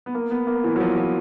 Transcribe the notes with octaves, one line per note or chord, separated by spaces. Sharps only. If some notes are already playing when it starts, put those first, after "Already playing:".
B3
A#3
B3
A#3
E3
F#3
F3
F3